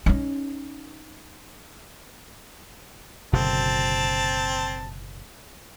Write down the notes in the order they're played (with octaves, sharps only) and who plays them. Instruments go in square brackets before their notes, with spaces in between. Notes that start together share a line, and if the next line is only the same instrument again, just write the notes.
[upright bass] C#4 D#4
[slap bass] F#1 B2 D3 [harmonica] C4 A5